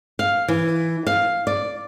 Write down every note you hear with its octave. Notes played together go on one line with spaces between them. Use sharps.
F5
E3
F5
D5